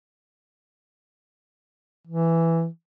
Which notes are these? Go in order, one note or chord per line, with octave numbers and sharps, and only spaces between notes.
E3